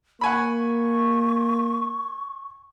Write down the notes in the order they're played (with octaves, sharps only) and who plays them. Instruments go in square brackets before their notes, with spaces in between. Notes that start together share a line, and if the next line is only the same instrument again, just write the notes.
[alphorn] A#3 [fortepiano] F#5 G#5 B5 [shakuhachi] C#6